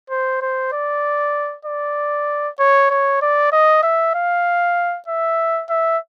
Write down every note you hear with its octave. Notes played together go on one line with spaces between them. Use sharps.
C5
C5
D5
D5
C#5
C#5
D5
D#5
E5
F5
E5
E5